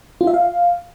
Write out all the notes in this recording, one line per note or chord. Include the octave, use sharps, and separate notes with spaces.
F4
E5
F5